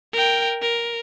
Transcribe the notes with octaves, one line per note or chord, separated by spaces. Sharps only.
A#4 G5
A#4